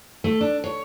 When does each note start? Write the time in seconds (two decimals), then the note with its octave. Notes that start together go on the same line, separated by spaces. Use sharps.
0.24 A3
0.41 D4
0.64 C#5